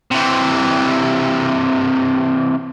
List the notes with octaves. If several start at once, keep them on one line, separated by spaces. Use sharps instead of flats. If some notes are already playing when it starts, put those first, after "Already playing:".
C3 E3